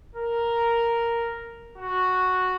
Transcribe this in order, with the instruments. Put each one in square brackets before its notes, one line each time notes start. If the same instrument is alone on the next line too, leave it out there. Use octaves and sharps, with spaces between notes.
[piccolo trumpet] A#4
F#4